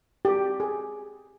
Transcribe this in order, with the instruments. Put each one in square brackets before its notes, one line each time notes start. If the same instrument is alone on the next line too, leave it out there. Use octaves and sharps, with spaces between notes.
[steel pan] G4
G#4